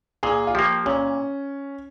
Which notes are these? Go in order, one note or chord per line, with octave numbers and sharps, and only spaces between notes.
A#2 G#4
F4
F3 A#3 G4
A#2 C#4